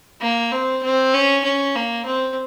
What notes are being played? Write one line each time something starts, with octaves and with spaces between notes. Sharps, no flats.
A#3
C4
C4
C#4
C#4
A#3
C4